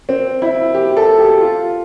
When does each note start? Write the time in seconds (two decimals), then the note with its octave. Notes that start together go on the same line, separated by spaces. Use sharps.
0.09 C4
0.42 E4
0.75 G4
0.97 A4
1.19 G4
1.41 F4